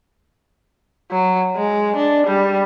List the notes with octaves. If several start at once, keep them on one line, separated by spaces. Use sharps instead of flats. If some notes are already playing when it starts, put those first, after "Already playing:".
F#3
G#3
D4
G3